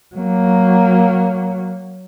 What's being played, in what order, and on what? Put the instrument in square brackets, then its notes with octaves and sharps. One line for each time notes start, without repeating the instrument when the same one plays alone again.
[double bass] F#3 A#3